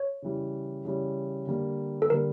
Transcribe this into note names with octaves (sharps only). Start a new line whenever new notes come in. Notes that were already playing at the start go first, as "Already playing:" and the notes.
Already playing: C#5
C#3 E3 G3
C#3 E3 G3
D3 G3 A#3
A4
D3 G3 A#3 A#4